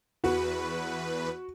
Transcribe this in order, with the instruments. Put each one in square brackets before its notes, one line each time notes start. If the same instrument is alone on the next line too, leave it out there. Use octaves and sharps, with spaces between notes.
[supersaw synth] E2 B4 [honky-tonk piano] F#4